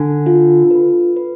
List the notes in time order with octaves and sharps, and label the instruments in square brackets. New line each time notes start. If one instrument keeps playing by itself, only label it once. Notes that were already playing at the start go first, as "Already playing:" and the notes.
Already playing: [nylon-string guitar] D3 [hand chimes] G#5
[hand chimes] F4
B4
B4